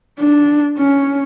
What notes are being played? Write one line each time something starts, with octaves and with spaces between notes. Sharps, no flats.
D4
C#4